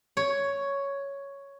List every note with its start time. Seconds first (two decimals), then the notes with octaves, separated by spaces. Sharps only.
0.17 C#5